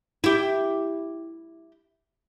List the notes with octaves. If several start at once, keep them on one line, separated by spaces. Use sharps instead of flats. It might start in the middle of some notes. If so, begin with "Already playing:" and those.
E4 G4